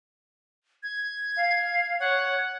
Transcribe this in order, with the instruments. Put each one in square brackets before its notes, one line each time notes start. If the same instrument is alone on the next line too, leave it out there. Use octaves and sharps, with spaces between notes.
[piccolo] G#6
[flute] F5
[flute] C#5 [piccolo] F#5